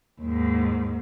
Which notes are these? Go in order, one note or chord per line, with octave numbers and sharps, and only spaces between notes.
D#2 G#2